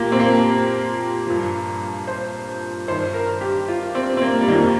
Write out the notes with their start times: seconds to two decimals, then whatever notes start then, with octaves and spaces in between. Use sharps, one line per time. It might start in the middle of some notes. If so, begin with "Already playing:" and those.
Already playing: A#2 F3 A#3 G4
0.12 C4
0.20 A#3
1.27 G2 F3
2.07 C5
2.87 G2 D#3 C5
3.14 A#4
3.41 G4
3.68 F4
3.95 C4
4.17 C4
4.21 A#3
4.41 G3
4.48 F2 D#3 A#3